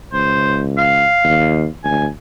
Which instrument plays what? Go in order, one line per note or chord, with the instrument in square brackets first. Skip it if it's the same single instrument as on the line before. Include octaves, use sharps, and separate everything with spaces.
[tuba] C#2 [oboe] C5
[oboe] F5
[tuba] D#2
[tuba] D2 [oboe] G#5